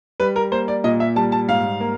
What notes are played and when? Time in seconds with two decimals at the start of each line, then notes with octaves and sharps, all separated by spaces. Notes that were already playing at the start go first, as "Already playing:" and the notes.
0.20 G3 B4
0.36 A#4
0.52 A#3 C5
0.68 D5
0.84 A#2 D#5
1.00 E5
1.16 G3 A5
1.32 A5
1.48 G#2 F5
1.80 A#3